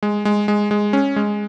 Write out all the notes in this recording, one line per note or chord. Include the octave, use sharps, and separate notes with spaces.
G#3
G#3
G#3
G#3
C#4
G#3